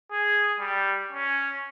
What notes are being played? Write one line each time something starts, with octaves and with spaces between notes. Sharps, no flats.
G#4
G3
C#4